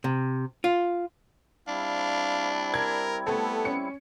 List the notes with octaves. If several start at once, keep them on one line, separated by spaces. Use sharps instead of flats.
C3
F4
G3 C4 D4 E4 F5
A#4 G#6
A3 B3 A4
C#4 C#7